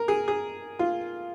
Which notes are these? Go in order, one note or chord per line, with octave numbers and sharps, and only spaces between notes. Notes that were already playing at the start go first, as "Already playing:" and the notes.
Already playing: A#4
G#4
G#4
F4